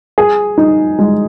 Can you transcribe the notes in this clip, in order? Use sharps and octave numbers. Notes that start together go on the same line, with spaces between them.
G#4
D#4
G#3